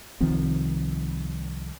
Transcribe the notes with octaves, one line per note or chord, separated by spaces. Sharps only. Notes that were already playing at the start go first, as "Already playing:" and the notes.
C2 D#3 F3 C4